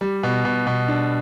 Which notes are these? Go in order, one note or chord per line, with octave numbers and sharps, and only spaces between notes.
G3
B2
B2
B2
D4